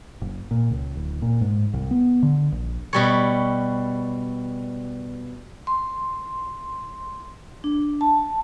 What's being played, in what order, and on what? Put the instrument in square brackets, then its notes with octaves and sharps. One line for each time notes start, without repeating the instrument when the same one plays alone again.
[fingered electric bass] F#1
A#2
C#2
D1
A#2
G#2
C2
B3
D3
A#1
[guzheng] B2 G3 C#5
[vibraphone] C6
D4
A5